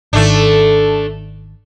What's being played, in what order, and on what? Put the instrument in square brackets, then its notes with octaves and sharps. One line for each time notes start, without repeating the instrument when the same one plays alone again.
[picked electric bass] G#1 D#3 [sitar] A3 D4